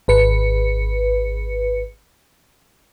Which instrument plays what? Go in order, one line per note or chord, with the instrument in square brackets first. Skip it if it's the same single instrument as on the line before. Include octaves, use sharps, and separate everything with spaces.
[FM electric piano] G#1 B4 C#7